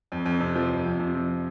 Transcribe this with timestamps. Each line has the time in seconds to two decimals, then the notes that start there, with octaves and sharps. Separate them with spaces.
0.12 F2
0.26 F2
0.40 C3
0.55 F3
0.70 F2
0.86 F2
1.00 C3
1.14 F3